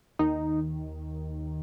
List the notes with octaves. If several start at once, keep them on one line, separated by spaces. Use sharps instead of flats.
D#2 D#3 D#4